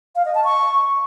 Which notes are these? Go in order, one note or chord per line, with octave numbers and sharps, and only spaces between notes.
F5
D#5
A5
C#6